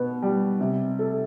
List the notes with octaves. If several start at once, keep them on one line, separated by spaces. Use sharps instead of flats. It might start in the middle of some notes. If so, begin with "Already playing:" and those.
Already playing: B2 B3
G3
C3
A4